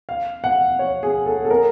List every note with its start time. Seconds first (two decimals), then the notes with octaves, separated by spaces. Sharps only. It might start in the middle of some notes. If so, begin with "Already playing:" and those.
0.09 F5
0.44 F#5
0.79 C#5
1.03 G#4
1.26 A4
1.45 A4
1.50 A#4